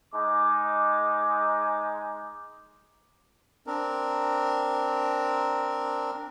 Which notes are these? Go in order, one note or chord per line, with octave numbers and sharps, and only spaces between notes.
G#3 D#4 D6
C4 D4 A#4